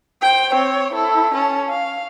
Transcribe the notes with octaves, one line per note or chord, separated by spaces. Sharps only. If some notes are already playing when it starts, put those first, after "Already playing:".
C5 G5
C4 C#5
E4 A4
C#4 A5
F5